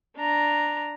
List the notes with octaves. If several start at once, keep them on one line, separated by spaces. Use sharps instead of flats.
D4 A#5